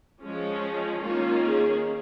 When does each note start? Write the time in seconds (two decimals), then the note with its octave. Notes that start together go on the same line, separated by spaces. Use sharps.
0.22 F3 G#3 C#4
1.02 D#3 A#3 C#4 F4
1.44 G#4